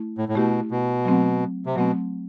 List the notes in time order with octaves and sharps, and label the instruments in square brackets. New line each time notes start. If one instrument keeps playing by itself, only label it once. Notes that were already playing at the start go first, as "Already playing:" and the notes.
Already playing: [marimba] A3 E4
[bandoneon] A2
A2
[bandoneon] B2 [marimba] A3 E4 G4
[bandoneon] B2
[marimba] F#3 A3 C4
[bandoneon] C3
[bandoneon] B2 [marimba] F#3 A3 C4